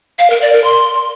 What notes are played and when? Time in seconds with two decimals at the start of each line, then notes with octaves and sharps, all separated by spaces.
0.19 F5
0.30 A#4
0.41 D5
0.53 A#4
0.64 C6